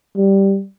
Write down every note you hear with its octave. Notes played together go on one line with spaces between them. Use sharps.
G3